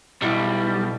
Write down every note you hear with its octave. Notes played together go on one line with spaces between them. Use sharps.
B1 G3 E4